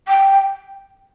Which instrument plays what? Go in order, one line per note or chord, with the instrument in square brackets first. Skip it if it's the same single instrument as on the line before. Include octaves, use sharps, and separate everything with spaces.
[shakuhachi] G5